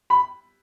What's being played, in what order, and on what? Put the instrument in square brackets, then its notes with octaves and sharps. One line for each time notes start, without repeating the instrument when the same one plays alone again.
[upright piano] B5